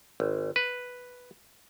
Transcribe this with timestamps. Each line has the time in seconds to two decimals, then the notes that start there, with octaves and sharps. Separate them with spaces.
0.20 G#1
0.56 B4